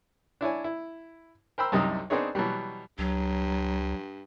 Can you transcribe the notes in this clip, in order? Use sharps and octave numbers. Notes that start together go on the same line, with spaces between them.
D4 E4 C#5 G#5
E4
A#4 C5 G5 B5 E6
C2 F#2 C3 G3 D#4 D#6
B3 C4 D4 D#4 G#4 C#5
B2 E3 F#3 G3
C#2 G2 F#3